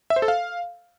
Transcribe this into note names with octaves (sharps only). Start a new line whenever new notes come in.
E5
C5
A4
F5